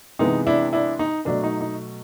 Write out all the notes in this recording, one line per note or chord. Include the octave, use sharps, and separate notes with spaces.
C3 E3 G#3 B3 D#4
D4 E4
D4 E4
D#4
B2 F#3 A3 D4
D#4
D#4